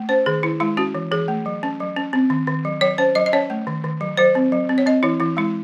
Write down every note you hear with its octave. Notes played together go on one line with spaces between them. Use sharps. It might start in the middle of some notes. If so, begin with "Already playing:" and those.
Already playing: A3
C#4 C5
D#3 G#4
D#3 E4
G#3 E4
C#4 F#4
E3
E3 G#4
A3
F#3
C#4
F#3
C#4
C4
D#3
D#3
F#3
F#3 C#5
C#4 C5
F#3 D#5
D#5
C#4 C#5
A3
D#3
D#3
F#3
F#3 C5
C4
F#3
C4
C#5
C4 D#5
E3 E4
E3 E4
G#3 E4